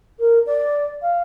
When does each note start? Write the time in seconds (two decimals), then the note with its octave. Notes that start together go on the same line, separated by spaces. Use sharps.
0.19 A#4
0.46 D5
1.02 F5